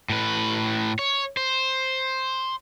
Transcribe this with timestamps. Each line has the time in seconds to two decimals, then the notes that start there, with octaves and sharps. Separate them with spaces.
0.10 A2 B4
0.99 C#5
1.37 C5